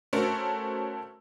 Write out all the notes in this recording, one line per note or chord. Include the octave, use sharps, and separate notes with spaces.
A3 C#4 F#4 A4 A#4 C5